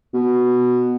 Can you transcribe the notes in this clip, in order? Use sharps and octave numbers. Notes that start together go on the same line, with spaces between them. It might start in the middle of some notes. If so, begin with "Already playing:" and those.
B2